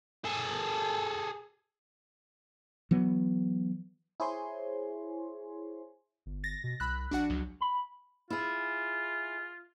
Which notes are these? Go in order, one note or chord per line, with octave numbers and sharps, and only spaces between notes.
G#4 A4
E3 F#3 B3
E4 G#4 C5 C#5 G#5 C6
G1
A6 A#6
B2
C2 B5 E6 F#6
A#1 D4 F#4 F#5
C#2 F#3
B5
E4 F4 G#4